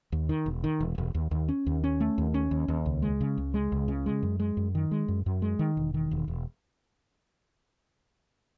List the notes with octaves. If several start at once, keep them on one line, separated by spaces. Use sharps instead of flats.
D#2
D#3
E1
D#3
E1
E1
D#2
D#2
C#4
D#2
C#4
A3
D#2
C#4
D#2
D#2
C#2
G#3
C#3
C#2
G#3
C#2
C#3
G#3
F#2
G#3
F#2
D#3
G#3
F#2
F#2
G#3
D#3
E1
D#3
E1
E1